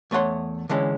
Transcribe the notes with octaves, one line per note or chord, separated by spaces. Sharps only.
E2 A3 C#5 F#5 C6
D3 E3 G#3 C#4